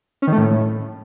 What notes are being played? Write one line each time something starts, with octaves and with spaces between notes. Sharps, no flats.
C#4
D#3
A3
A2